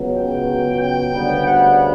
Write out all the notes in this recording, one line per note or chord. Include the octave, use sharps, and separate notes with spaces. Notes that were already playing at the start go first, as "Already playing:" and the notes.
Already playing: C#2 C#3 F#3 B3
G5
G5
D2 C#3 G3 B3
F#5